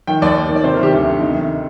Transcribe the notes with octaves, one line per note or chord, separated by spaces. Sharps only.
D#3 G5
D#2 D5
D#2
D#3
D5
C3 C5
D#3 A#4
G4
D2
D2
C3 D#4
D#3